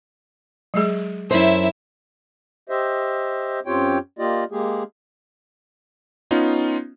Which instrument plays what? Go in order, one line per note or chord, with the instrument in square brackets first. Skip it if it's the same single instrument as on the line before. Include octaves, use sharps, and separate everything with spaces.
[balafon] F#3 G#3 G#4
[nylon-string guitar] F#2 C5 [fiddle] E4 E5
[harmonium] G4 C5 D#5 E5
F#2 C4 F4 G4 C#5 G5
A#3 F4 G4 D5 D#5
G#3 A#3 G4 G#4
[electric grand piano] B3 C#4 D#4 F4